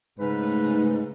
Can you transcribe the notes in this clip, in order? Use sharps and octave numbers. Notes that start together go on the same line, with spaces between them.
G#2 C#3 A3 D#4 B4